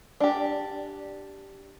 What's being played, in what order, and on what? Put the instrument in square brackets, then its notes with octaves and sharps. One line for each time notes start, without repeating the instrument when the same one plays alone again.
[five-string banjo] D4 G4